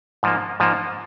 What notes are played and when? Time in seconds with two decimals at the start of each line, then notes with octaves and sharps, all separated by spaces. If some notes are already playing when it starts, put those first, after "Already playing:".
0.23 G#2 F3 A#3
0.60 G#2 F3 A#3